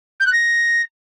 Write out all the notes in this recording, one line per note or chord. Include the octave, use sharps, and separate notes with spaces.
G6
F#6
A#6